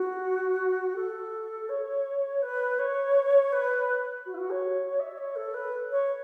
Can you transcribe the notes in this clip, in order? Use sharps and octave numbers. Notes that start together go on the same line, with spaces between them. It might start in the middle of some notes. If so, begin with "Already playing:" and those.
Already playing: F#4
A4
C#5
B4
C#5
B4
F#4
E4
F#4
C#5
E5
C#5
A4
B4
C#5